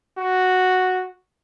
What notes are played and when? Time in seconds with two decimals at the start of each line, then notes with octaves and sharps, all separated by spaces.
0.18 F#4